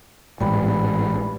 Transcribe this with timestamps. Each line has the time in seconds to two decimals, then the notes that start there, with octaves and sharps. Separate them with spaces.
0.40 A1 G#2 G3 B4